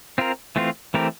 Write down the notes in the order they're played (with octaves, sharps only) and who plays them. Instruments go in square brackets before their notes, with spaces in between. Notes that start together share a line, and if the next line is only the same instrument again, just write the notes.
[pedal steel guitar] C4 F4 A#4
E3 A3 C4 F4
E3 A3 C4 G4 A#4